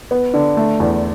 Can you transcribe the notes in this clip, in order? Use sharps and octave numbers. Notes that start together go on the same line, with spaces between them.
B3
D3
A3
E2